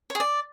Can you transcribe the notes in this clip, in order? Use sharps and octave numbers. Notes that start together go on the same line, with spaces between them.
C#5
G#4
D5